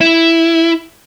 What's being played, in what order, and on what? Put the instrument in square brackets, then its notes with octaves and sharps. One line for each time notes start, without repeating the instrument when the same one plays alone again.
[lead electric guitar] E4